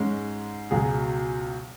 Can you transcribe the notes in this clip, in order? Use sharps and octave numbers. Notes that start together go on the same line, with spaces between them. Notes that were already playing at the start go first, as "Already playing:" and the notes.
Already playing: G#2 G#3 C#4
C#2 B2 F#3 G#4